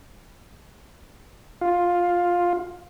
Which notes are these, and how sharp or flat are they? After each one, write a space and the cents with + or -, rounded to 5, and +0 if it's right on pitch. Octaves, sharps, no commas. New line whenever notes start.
F4 +10